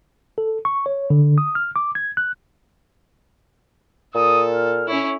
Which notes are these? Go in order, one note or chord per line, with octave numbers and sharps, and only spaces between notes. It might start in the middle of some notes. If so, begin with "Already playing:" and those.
A4
C#6
C#5
D3
D#6
F6
D6
G#6
F#6
A#2 A4 D#6
F6
C#4 E4 C#5